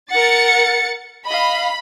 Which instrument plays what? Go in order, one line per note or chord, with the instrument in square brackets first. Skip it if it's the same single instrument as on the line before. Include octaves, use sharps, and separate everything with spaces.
[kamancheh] A#4 F#5 [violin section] A6 C#7
[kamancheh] D#5 F5 [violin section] B5